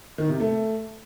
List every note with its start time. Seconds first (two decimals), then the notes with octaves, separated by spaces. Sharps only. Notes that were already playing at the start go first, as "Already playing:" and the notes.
0.18 D#3
0.29 C3
0.40 A3